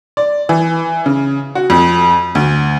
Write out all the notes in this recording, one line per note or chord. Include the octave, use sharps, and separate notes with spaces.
D5
E3
C#3
F#4
F2
D2